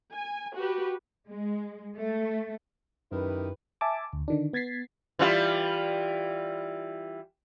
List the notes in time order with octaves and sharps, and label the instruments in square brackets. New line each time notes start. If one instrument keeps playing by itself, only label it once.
[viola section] G#5
F#4 G4 B4
[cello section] G#3
A3
[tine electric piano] F#2 [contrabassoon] D#3 [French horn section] E4 G4 B4
[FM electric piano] E5 G#5 A5 D6
D2
D3 D#3 D4
B3 G#6 A6 B6 C7
[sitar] E3 G3 F4